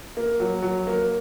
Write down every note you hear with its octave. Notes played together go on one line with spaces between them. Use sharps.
A#3
F#3
F#3
A#3